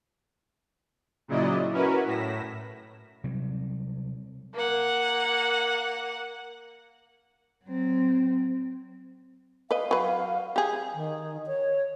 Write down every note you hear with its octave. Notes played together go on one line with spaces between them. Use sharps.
A#2 C#3 F#3 E4 D5 D#5
C#4 E4 F#4 A#4 B4
A2 A#6 B6 E7
C3 F#3 G3
A#3 F#5
F#3 C4
B4 D#5 F5
F#3 B4
G4 G#4
D#3
C#5